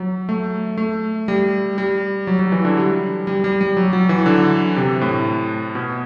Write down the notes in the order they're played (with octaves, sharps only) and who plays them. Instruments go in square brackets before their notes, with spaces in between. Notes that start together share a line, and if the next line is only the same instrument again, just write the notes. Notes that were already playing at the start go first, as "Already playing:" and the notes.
Already playing: [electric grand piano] F#3
A3
A3
G3
G3
F#3
F#3
E3
D3
G3
G3
G3
G3
F#3
F#3
E3
D3
C3
A2
B2